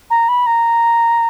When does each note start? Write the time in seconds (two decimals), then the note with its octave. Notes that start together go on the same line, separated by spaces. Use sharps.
0.10 A#5
0.29 B5
0.46 A#5